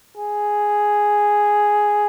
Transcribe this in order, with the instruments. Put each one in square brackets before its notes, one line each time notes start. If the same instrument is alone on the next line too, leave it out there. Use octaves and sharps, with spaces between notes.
[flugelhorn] G#4